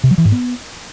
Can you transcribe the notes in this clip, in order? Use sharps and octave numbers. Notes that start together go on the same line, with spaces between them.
C3
F#3
E3
G#2
B3